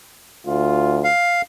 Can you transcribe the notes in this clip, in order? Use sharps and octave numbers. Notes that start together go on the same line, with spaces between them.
D2 F4
F5